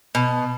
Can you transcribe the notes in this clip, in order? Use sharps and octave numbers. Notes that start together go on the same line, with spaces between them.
B2